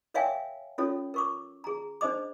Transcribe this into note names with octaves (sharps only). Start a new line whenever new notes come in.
A#4 C#5 E5 F5 G5 G#5
C#4 F4 A4 C#5
A#4 C#6 D6
G#4 A#5
D4 C5 D#5 D6